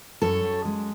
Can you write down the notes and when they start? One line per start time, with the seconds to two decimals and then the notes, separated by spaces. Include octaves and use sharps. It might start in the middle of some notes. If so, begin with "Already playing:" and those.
0.22 F#2 A4 C#5
0.43 F#2
0.65 G#3